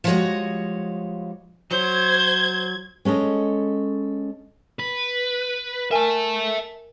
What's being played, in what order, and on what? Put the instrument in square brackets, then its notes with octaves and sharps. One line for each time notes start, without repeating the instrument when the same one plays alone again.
[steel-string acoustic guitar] F3 G3 G#3 F#4 C#5 D#5
[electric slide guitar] F#3 [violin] C5 G6 [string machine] G#6
[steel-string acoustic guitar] G#3 C#4 A4 D#5
[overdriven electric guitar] B4
[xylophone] A#4 G#5 [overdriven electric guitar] E5 A5